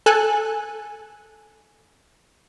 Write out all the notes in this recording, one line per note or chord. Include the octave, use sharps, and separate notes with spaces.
A4 G#5 F#6